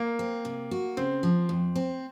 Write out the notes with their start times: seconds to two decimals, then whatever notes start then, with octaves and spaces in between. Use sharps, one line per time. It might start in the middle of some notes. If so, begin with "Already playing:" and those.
Already playing: A#3
0.19 C4
0.45 C3
0.71 F#4
0.97 C#3 C4
1.23 F3
1.49 F2
1.76 C4